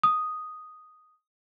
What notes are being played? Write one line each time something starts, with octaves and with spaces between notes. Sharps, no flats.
D#6